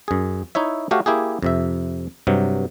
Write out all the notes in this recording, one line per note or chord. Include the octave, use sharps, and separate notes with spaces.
F#2 G#4
D#4 E4 C#5 E5
A3 F#4 G4 C#5 F5
A#3 E4 G4 G#4
F2 C3 E5
G2 C3 F#3